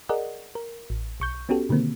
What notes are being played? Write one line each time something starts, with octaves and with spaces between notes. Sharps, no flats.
G#4 A#4 D5 D#5 F#5
A#4
A1
B1 C#6 G6
B3 C#4 F#4 G4 A4
B2 D3 D#3 A#3 C4